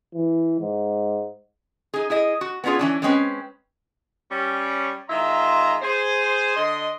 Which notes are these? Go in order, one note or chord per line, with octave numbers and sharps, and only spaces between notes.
E3
G#2
D#4 G#4
E4 G#4 D#5
F#4
B3 C#4 D4 F4 G#4
E3 C#4 D4
D3 G#3 C4 C#4 B4
G3 C#4
D#3 G#3 F4 E5 A#5 C6
G#4 C5
D3 D#5 C6